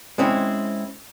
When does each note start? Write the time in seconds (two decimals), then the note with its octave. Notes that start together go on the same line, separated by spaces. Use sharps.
0.18 G#3 C4 C#4 E4